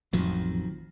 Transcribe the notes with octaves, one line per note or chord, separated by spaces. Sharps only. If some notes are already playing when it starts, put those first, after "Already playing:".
A1 F2 D#3 F3 F#3